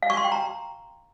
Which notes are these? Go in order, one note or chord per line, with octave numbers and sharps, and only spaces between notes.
F5
C#6
C6
G5
A#5